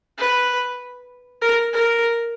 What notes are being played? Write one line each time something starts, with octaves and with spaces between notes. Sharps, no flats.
B4
A#4
A#4